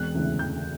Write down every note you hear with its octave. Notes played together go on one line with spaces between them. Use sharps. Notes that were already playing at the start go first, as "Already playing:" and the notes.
Already playing: E1 F#6
D2 C#3 E3
E1 G6